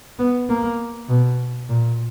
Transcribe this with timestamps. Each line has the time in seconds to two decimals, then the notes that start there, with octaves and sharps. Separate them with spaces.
0.19 B3
0.49 A#3
1.08 B2
1.69 A#2